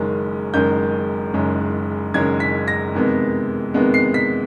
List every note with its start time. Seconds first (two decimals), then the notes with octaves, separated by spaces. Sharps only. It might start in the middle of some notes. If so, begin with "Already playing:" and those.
Already playing: F#1 F#2 D#3 G#3 C#4
0.54 F#1 F#2 D#3 G#3 C#4 G6
1.33 F#1 F#2 D#3 G#3 C#4
2.14 F#1 F#2 D#3 G#3 C#4 G#6
2.40 B6
2.68 A#6
2.94 F2 C3 D#3 G#3 B3
3.74 F2 C3 D#3 G#3 B3
3.94 C7
4.14 B6